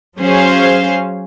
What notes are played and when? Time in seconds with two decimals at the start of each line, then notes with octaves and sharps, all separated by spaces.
0.20 F#3 C#4 G#4 C5 F5